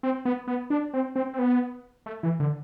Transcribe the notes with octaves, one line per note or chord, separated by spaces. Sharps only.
C4
B3
B3
D4
C4
C4
C4
B3
A3
E3
D3